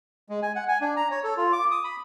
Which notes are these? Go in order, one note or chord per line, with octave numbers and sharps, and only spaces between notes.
G#3
G#5
F#5
G#5
D4
A#5
C#5
A4
F4
D6
D#6
B5